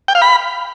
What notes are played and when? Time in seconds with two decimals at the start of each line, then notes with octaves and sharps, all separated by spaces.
0.08 G5
0.15 F5
0.22 B5